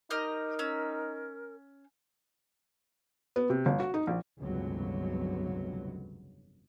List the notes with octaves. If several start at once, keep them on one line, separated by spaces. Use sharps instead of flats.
D#4 G4 A#4 D#5 F6
C#4 E6
B3
C3
G1
F#4
D#4
A#1
F1 C#2 G2 D3 F#3 B3